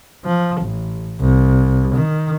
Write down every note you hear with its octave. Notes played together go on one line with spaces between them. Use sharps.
F3
A1
C2
D#3